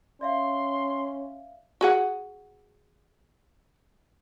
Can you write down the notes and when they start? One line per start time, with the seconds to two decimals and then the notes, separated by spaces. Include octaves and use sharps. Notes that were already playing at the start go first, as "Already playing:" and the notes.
0.21 C#4 D5 E5 F5 C6
1.81 F#4 G#4 F#5